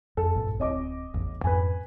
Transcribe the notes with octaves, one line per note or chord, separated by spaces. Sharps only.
F2 A4
A#1 G2 A#2
D1 C4 C#5 D#5 D6
A1 E2
F2 G#2 B4 G#5